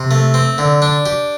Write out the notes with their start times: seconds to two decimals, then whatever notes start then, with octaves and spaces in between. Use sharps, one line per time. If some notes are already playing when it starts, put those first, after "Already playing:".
Already playing: C3
0.11 A3
0.34 C4
0.58 D3
0.82 D4
1.06 G4